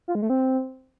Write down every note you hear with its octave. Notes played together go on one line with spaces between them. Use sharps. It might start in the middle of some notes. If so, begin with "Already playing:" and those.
F4
G#3
A3
C4